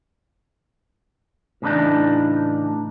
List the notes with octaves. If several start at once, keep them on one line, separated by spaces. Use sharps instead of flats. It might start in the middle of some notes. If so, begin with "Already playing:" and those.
A2 C#3 E3 G3 D4 D#4